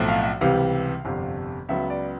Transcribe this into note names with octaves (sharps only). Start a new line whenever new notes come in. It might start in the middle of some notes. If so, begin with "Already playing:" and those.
Already playing: B1 A2 F3 A3 C4
F5
C#2 C3 E3 G3 F5
G1 F2 C3
C#2 C#3 F#3 B3 E5
D5